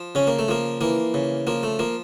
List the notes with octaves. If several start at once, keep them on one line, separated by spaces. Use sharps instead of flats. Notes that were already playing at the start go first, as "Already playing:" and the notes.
Already playing: F3
C#3 C#4
A#3
A3
F3 A#3
E3 A#3
C#3
F3 A#3
A3
F3 A#3